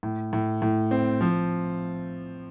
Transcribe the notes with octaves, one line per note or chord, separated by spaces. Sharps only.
A2
A2
A2
C4
F3